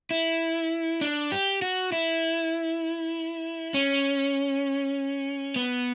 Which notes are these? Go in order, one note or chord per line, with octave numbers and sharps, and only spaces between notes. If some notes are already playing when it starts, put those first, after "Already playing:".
E4
D4
G4
F#4
E4
C#4
B3